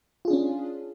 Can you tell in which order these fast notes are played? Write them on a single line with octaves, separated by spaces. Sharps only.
F4 G#4 D4 C#4